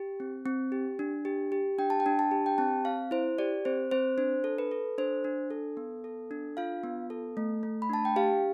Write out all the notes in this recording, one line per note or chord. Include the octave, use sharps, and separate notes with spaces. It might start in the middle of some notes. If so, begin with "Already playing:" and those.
Already playing: G4
C4
C4
G4
D4
G4
G4
D4 G5
A5
G5
D4
A5
G4
G5
C4 A5
C4 F5
E4 C5
G4 D5
C4 C5
C4 C5
D4 C5
A4
B4
A4
D4 C5
D4
A4
B3
A4
D4
F4 F5
B3
A4
A3
A3
B5
D4 A5
G5
G4 F5